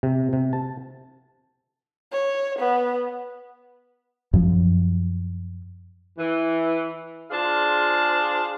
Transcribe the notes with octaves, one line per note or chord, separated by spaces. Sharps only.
C3
C3
A5
C#5
B3
F#2 F3
E3
D4 F4 G#4 C5 F5 A5